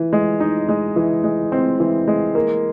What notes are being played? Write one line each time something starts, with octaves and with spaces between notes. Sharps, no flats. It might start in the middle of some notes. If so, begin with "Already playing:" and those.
Already playing: E3
G#3
D#4
G#3
E3
G#3
C4
E3
G#3
A#3